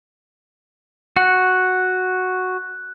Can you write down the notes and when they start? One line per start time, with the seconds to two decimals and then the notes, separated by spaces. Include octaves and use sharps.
1.16 F#4 F#5 F#6